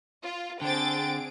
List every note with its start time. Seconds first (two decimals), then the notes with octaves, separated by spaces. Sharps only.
0.24 F4
0.62 D3 C4 G#4 G5 A6 D7